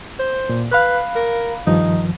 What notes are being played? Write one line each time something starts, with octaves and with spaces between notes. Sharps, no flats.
C5
A#2
B4 F5 B5 F#6
A#4
G2 D#3 F3 D#4